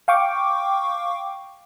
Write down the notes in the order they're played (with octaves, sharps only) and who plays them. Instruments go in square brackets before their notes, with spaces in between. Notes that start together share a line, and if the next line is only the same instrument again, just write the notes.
[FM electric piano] F5 G5 C#6 D6